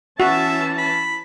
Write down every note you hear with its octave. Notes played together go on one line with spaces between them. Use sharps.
E3 C#4 F#4 E5 A5
B5